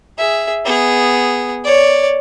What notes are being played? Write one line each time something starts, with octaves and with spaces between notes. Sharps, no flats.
G#4 E5
B3 G#4
C#5 D5